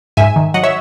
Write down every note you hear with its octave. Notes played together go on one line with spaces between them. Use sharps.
G#2 E5 G#5
D#3
F#3 D#5 F#5
C#5 E5